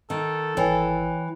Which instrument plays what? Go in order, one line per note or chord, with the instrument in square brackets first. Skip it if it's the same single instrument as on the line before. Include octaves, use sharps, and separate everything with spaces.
[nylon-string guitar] D#3 [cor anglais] A4
[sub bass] G#1 [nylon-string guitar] E3 [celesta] C#5 G5 G#5